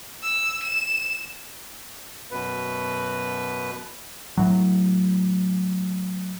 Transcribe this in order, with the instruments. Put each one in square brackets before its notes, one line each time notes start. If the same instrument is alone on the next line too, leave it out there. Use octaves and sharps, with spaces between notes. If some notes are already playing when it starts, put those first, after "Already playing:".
[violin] E6
E7
[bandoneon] F#2 B2 B4
[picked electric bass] A2 F#3